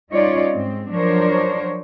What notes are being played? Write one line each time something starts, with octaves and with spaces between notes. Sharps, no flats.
G3 C#4 D#4 F4 C#5 D5
G#2 G#3 C4
F3 F#3 D4 A#4 C5 C#5